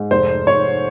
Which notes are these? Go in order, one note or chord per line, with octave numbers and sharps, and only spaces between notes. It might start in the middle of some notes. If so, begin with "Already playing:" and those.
Already playing: G#2
F1 C5
F1 C#5